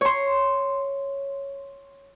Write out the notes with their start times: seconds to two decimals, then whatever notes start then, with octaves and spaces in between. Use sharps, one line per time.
0.01 C#5 C6